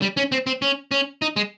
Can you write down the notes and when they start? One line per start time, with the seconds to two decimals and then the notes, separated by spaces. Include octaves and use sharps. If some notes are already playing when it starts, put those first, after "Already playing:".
0.02 G3
0.17 C#4
0.32 C4
0.47 C4
0.62 C#4
0.91 C#4
1.22 D#4
1.36 G#3